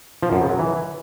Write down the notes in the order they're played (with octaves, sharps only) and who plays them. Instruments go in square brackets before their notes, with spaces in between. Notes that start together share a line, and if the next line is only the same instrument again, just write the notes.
[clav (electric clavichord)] F3
F#2
C#3
F#3
E3